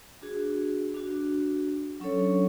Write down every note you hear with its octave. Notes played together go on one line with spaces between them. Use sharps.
D4 F#4 G#4
D4 F#4
F#3 C#4 D4 A4 C#5